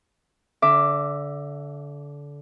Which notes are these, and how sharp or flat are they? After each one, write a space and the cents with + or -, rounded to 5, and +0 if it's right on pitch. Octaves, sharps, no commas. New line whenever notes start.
D3 -25 E5 +10 D6 +5